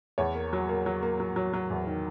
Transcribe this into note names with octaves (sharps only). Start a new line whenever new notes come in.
E2 C#5
A#3
F#3
A#3
F#3
A#3
F#3
F#3
F#3
E2
D#3